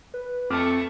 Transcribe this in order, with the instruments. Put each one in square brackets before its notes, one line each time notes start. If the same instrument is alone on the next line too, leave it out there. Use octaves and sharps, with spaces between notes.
[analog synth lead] B4
[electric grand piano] F2 D6 F6 [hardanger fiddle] A3 C#6 [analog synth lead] C4